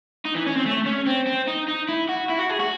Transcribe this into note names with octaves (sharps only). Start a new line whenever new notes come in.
D#4
E3
C#4
C4
A3
C#4
C4
C4
D#4
D#4
E4
F#4
E4
F#4
G#4
F#4